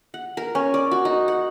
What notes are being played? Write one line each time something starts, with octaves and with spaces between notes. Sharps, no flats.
F#5
A#4
C#4
D5
F#4
D#4
F#5